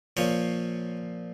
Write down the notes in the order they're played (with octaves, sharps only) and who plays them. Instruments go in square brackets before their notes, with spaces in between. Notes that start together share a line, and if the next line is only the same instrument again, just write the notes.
[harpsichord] A#2 F3 C#5